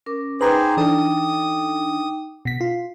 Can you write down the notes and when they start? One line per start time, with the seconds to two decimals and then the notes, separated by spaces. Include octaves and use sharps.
0.06 C#4 A#4 D6
0.41 D#4 G#4 B4 C5 G5 A#5 D6
0.77 E3 D4 A4 D#6
2.45 B2 B6
2.61 F4